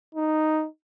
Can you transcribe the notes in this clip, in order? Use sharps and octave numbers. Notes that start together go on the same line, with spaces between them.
D#4